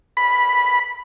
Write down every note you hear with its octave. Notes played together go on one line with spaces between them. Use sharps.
B5